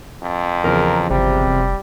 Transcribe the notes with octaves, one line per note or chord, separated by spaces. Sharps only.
F2
E2 C#3 F3 A#4
G1 C3 G3
F1